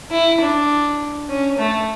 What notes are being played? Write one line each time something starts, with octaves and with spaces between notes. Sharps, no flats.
E4
D4
C#4
A3